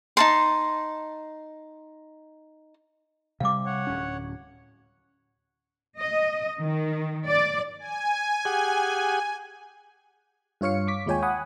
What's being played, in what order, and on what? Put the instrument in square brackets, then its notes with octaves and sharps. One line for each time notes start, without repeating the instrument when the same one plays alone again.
[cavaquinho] D#4 A5 C6
[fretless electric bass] C3 G3 [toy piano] F5 D6
[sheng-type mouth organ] C#5 F#5
[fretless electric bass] D1 C#4
[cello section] D#5
D#3
D5
[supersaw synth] G#5
[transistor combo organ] G4 G#4 F#5
[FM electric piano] G2 F4 C#5 F5 C#7
C#6 D6 B6
D#2 G#3 F4 C#5 G5 G#5
F#5 G#5 B5 D#6